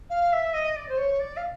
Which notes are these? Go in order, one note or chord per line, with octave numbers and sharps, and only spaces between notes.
F5
E5
D#5
D5
C5
C#5
D5
F5